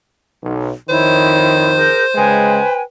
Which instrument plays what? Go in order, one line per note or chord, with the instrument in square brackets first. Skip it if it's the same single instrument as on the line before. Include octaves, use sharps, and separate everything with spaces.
[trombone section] B1
[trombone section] F2 D#3 [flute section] E4 C#5 [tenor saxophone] C5
[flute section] G#4 A#4 G6
[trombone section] C#3 G#3 [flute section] B4 G5 G#5